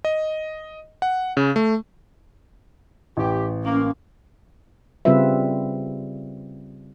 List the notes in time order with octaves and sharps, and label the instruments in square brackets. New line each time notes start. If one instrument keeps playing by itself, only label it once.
[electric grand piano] D#5
F#5
C#3
A3
[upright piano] A1 [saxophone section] G4
[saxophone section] A#3 [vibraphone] C#4
[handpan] C#3 G3 C4 F4 B4 E5